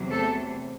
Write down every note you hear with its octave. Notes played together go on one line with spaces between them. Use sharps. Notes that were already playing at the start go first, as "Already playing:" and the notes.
Already playing: E2 C3 F#3
A3 A4